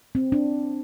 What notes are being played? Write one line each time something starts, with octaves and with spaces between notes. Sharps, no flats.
C4
D4